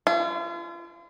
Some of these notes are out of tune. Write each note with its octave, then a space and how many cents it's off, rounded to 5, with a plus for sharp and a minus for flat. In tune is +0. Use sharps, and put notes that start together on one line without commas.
F4 -40